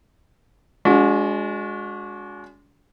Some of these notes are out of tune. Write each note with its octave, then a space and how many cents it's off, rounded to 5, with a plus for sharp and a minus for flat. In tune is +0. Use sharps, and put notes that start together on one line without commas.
G#3 +0 D4 -40 F#4 -30